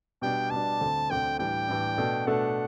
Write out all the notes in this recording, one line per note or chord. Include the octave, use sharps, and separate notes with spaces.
B2 G3 D4 G5
B2 G3 D4 A5
D2 D3 A3 C4
D2 D3 A3 C4 G5
A2 E3 G3 D4 G5
A2 E3 G3 D4
B2 A3 D4 A4
B2 A3 D4 A4 F#5